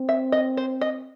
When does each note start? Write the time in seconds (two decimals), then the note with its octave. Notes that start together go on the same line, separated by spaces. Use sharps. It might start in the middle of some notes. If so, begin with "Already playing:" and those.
Already playing: C4
0.09 E5
0.32 D#5
0.57 C5
0.81 D#5